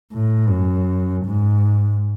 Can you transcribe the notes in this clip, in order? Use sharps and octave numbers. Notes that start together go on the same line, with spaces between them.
A2
F#2
G#2